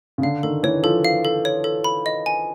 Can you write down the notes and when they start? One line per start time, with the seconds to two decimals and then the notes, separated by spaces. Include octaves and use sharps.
0.18 C#3
0.22 D3 F5
0.43 D#3 A4
0.63 E3 C#5
0.83 F3 A4
1.05 F5
1.25 A4
1.45 C#5
1.64 A4
1.84 B5
2.06 D#5
2.26 G#5